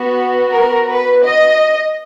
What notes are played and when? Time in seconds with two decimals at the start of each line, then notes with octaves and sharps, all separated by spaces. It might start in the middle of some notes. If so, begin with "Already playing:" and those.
Already playing: B3 F#4
0.52 A#4
0.89 B4
1.24 D#5